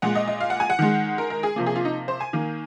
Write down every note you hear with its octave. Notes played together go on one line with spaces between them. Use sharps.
A#2 G#3 F#5
D#5
D#5
F5
F#5
G#5
F#5
D#3 G#3
A#4
A#4
G#4
C3 F3 A#3
G#4
F4
D#4
C5
G#5
D#3 A#3